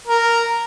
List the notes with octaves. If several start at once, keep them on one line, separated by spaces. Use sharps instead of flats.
A#4